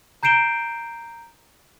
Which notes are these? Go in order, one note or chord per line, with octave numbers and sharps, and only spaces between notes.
A#5 G6 C7 D7 E7 G7